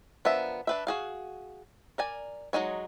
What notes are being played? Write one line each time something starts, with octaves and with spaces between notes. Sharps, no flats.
F3 B3 D4 A#4 E5
D4 B4 E5
F#4 G#4 F5
A#4 D5 G#5
F#3 G#3 D#4 C#5